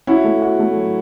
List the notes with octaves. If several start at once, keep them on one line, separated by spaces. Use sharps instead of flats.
C#4 E4 F#4
A3
F#4
A3
F#3